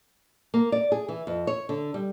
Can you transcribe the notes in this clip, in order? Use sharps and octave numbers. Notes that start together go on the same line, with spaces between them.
A#3
D5
G#4
E3
F2
C#5
D3
G3